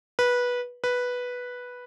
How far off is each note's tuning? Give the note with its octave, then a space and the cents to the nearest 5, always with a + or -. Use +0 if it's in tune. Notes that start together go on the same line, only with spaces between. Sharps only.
B4 -15
B4 -5